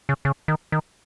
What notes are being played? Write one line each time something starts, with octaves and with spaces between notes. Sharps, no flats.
C#3
C#3
D#3
D#3